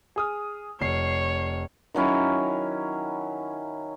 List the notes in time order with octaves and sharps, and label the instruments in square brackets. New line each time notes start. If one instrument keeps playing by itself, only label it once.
[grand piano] G#4 D#6 F6
[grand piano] F1 C7 [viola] C#5
[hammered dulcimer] D#3 F#3 C#4 E4